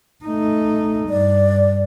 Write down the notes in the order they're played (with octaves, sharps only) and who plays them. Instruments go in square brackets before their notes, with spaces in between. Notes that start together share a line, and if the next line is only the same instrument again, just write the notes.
[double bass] A3 D#4
[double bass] G2 [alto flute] D5